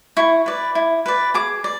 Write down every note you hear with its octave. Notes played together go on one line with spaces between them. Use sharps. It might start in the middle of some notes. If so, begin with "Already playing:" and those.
E4 C#6
B4 D5
E4
B4 D5
G#4 D6
D5